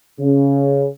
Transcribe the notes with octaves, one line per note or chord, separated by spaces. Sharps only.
C#3